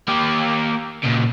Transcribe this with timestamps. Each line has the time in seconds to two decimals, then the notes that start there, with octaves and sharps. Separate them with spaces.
0.08 A#3 G4
1.03 A#2 C#3